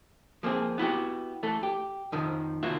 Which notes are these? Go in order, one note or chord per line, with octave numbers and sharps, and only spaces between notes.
F3 A#3 C4 G#4
B3 E4 F#4 G4
E3 A3 A4
G4
F2 D#3 F3
C2 D#3 A#3 F4 F#4 E5